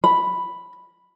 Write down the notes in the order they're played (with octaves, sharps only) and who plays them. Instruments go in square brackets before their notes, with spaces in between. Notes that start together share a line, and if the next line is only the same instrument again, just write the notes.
[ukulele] B5